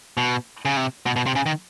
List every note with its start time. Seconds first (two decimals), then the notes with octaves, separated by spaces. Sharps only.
0.17 B2
0.65 C#3
0.76 C3
1.06 B2
1.16 B2
1.26 C3
1.35 C#3
1.46 D#3